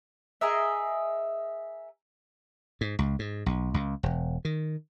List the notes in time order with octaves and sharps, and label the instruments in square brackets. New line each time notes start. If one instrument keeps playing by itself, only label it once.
[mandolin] G#4 A#4 D#5 E5
[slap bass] G#2
C#2
G#2
B1
C#2
E1
D#3